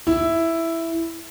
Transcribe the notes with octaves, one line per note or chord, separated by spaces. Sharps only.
E4